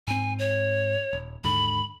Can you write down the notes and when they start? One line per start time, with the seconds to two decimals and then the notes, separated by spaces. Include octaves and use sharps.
0.08 G#2 C4 G#5
0.39 C#5
1.13 D#1
1.44 D#2 G#2 D3 B5